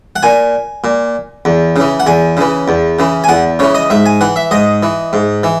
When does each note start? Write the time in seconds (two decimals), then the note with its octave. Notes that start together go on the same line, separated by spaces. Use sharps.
0.16 F#5
0.23 A#2 G#5
0.84 A#2
1.45 E2
1.76 C#3 E3
2.00 F#5
2.07 E2 G#5
2.37 C#3 E3
2.68 E2
2.99 C#3 E3
3.24 G#5
3.28 E2 F#5
3.59 C#3 E3 C#5
3.74 D#5
3.90 G#2 E5
4.06 G#5
4.21 E3 F#5
4.36 E5
4.51 G#2 D#5
4.83 E3
5.13 G#2
5.43 E3